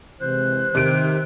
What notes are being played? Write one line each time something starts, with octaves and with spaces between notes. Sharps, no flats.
C3 E3 G#3 C5 F#6
C3 D#3 D7